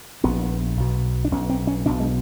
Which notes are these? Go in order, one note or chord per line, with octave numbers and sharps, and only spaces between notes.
A#1 A#2 B3
B1 B2
D4
B1 B2 C#4
C4
C#4
B1 B2 D4
G#3